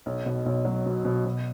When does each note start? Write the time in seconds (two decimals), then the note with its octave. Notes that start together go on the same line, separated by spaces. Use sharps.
0.06 B1
0.26 B2
0.46 B1
0.65 F#3
0.86 B2
1.05 B2
1.25 B2